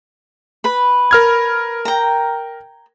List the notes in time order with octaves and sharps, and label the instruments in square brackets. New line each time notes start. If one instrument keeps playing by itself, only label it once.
[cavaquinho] B4 B5
[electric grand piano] A#4 F6 G#6
[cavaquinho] G5 A#5